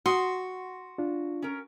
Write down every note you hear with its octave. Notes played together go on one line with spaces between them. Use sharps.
F#4 F#5 C6 D#6
D4 F4
C#4 A#4